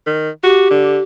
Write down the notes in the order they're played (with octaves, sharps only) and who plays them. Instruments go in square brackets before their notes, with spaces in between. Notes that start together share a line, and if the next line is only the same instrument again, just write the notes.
[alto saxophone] D#3
[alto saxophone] F#4 [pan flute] G4
[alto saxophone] D3